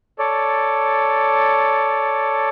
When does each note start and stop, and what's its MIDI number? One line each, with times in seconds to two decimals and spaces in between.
0.19 2.49 69
0.19 2.49 73
0.19 2.49 74